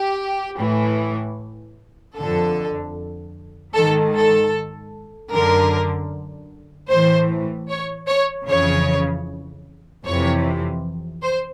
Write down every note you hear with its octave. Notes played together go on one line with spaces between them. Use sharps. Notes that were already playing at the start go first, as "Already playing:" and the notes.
Already playing: G4
A2 E3
F2 D3 A4
G#2 D#3 A4
A4
F#2 D3 A#4
A2 E3 C5
C#5
C#5
F2 C#3 E3 C#5
F2 C3 E3 C#5
C5